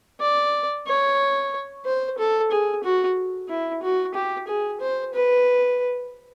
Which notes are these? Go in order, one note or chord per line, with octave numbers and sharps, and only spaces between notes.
D5
C#5
C5
A4
G#4
F#4
E4
F#4
G4
G#4
C5
B4